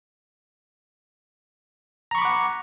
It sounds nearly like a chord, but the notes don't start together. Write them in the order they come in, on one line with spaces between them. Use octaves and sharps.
A#5 C#6 B5 D6 F#5